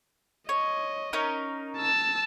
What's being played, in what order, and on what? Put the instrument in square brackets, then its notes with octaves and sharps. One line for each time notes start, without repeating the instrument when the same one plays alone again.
[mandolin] C#5 [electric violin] D#5
[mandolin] C#4 D#4 A#4
[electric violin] A5 E6